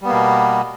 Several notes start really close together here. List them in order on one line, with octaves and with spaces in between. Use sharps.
G3 B3 A#3 B2